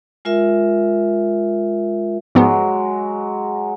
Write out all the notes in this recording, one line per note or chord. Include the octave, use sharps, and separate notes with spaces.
G#3 F4 A#4 E5
G#2 F3 F#3 G#3 B3